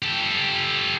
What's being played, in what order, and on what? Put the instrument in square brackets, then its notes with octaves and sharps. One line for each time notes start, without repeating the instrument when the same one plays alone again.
[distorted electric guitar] G4 A4